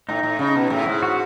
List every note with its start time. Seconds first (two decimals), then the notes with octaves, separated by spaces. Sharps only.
0.09 A2 D#4
0.23 A2
0.39 C#3 D#4
0.55 B2
0.70 A2 E4
0.86 G#2
1.03 F#4